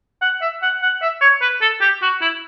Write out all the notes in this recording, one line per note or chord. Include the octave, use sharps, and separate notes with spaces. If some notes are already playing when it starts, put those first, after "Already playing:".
F#5
E5
F#5
F#5
E5
C#5
B4
A4
G4
F#4
E4